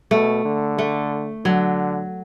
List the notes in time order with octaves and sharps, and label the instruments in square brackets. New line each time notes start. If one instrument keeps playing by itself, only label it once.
[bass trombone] B2 [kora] A3
[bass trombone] D3
[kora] A3
[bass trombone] D3 [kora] F#3